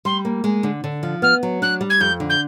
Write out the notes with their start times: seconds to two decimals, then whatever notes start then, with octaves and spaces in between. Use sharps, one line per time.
0.05 G3 C6
0.25 A#3
0.44 G#3
0.63 D3
0.84 D3
1.03 F3
1.22 B3 F6
1.43 F#3
1.62 D4 F#6
1.81 G3
1.89 G#6
2.00 F2 G6
2.20 D3
2.29 G6